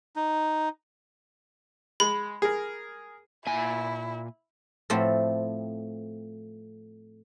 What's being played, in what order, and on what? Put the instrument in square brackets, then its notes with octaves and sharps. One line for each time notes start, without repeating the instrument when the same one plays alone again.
[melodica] D#4
[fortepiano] G#3 [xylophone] B5
[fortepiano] G#4 A#4
[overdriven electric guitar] A#2 G#5 [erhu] E4
[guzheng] A2 F3 A3 C4